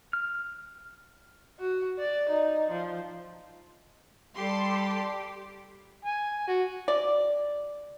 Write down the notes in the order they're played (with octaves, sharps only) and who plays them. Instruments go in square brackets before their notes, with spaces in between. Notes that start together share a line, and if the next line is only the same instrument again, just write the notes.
[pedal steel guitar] F6
[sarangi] F#4
D5
D#4
F3
[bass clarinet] G3 [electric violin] G4 [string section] A4 C6
[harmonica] G#5
F#4
[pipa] D5